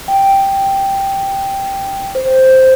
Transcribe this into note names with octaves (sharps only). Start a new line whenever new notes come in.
G5
C5